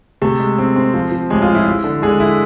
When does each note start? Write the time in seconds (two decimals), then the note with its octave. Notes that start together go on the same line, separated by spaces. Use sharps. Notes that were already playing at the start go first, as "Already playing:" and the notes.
0.22 C3 A3 A4
0.40 G#3
0.58 C4
0.76 C4
0.94 F3
1.11 F3
1.30 A1 G#3 G#4
1.42 F4
1.49 F3
1.55 E4
1.66 E4
1.84 D3
2.02 D3 G#3 G#4
2.20 E4